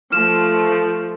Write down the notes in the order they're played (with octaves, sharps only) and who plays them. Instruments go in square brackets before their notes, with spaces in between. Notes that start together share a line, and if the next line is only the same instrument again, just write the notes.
[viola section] F3 A3 [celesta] F6 E7